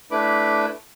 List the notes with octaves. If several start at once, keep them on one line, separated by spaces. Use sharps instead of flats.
A3 D4 E4 B4 B5 D6